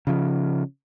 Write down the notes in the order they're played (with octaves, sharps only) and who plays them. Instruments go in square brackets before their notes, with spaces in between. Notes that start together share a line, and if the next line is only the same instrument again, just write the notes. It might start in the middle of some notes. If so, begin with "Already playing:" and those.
[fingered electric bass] C#3 F3